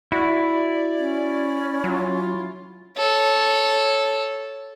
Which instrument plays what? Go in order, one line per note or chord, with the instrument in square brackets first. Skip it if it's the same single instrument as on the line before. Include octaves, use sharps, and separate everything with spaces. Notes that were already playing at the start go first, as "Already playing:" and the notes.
[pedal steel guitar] E4 [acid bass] F#4 [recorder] D5
[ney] C#4
[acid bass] F#3 [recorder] F4
[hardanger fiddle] A4 C#5